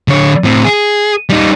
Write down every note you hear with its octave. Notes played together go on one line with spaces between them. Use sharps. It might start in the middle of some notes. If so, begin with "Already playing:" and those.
D3 C#5
A2 C4
G#4
G3 D#4